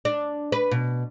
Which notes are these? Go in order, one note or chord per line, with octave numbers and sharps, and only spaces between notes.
D4
B4
B2